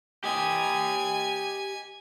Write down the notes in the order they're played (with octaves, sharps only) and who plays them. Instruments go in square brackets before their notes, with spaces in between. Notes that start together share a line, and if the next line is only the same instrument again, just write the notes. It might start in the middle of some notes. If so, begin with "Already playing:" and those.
[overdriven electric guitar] G4 D#5 [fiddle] G#5